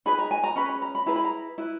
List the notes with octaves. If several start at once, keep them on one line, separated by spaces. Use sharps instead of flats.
D#4 G#4 B4 B5
A#5
G#5
A#5
C#4 G#4 B4 B5
B5
A#5
B5
E4 G#4 B4 A#5
B5
A#5
E4 B4